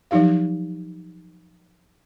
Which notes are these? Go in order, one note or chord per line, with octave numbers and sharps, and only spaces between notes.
F3 F#3 D#4 G4 F5